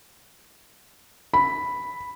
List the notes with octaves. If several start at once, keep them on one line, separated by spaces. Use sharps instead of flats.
B5